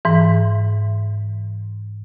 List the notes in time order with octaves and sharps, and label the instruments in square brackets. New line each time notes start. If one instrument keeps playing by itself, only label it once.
[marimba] G#2 E3